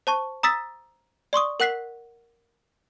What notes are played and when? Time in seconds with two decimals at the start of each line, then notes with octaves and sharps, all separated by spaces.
0.07 C5 A5 C#6
0.43 A#5 D#6 E6 A6 B6
1.33 D5 C6 C#6 D#6
1.60 A#4 F#5 F#6 B6 C7